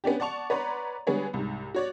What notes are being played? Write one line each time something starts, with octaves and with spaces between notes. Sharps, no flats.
B3 C#4 D4 G4
D5 F#5 A5 C#6 F7
B4 C#5 D5 F#5 A#5 C6
D3 G3 G#3 B3 G#4 C#5
C2 G#2
F#4 C#5 D5